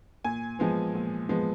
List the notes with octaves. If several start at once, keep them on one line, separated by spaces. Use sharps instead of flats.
A#2 G#5
F3 G#3 B3
A#2
F3 G#3 B3